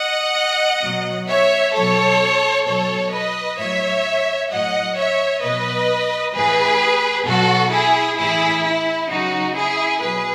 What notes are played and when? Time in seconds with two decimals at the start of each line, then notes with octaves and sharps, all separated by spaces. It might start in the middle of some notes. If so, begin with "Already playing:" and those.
Already playing: D#5 F#5
0.83 B2 F#3
1.28 C#5 E5
1.74 B2 F#3 A4 C#5
2.66 B2 F#3 A4 C#5
3.12 B4 D#5
3.58 A2 F#3 C#5 E5
4.50 A2 F#3 D#5 F#5
4.96 C#5 E5
5.42 B2 F#3 B4 D#5
6.35 A2 E3 G#4 B4
7.26 B2 F#3 F#4 A4
7.71 E4 G#4
8.18 A2 E3 E4 G#4
8.64 E4
9.09 C#3 F#3 D#4 F#4
9.55 E4 G#4
10.02 B2 F#3 G#4 B4